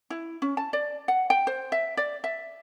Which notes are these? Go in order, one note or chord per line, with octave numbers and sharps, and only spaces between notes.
E4
C#4
A5
D5
F#5
G5
C5
E5
D5
E5